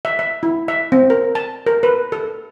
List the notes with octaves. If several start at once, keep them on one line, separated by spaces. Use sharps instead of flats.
E5
E5
E4
E5
C4
A#4
A5
A#4
B4
A4